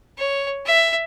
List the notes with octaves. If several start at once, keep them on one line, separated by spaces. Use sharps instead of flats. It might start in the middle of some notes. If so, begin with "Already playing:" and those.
C#5
E5